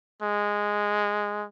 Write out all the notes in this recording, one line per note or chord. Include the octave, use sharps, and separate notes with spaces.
G#3